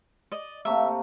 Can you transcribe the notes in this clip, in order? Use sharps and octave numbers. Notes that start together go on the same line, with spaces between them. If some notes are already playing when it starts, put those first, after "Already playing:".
D5 D#5
C3 A3 A#3 E5